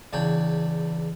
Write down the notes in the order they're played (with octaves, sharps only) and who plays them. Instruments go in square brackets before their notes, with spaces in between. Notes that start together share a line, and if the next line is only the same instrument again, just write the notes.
[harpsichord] E2 C#3 D4 G5